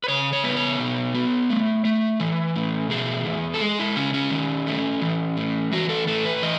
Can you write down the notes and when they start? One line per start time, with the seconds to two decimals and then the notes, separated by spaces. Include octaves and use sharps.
0.04 B4
0.08 C#3 C#5
0.33 C#5
0.44 B3 B4
0.56 C#5
0.79 B2
1.14 B3
1.50 A3
1.85 A3
2.20 E3
2.56 A2
2.90 B2 G#4
3.26 E2
3.54 A4
3.61 G#3 G#4
3.79 E4
3.96 C#3 C#4
4.14 C#4
4.31 D#3
4.67 A3
5.02 E3
5.37 A2
5.72 E3 F#4
5.89 A4
6.07 A2 A4
6.26 B4
6.43 E3 D#5